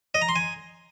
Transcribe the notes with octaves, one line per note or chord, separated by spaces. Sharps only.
D#5
A#5
C6
G#5